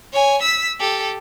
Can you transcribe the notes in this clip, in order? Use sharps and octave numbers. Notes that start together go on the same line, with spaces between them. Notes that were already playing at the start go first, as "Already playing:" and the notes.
C#5 G#5
E6 B6
G4 A4